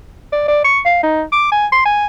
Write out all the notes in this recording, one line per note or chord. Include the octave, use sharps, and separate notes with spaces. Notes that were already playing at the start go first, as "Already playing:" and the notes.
D5
D5
C#6
F5
D#4
D6
G#5
C6
G#5